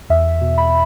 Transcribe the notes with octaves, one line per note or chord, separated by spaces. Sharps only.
E2 E5
B2
B5